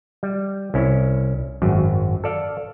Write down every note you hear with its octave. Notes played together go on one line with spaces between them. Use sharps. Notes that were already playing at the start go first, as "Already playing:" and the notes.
G3
C2 C#4 E4
G#1 F#2
A4 D5 F5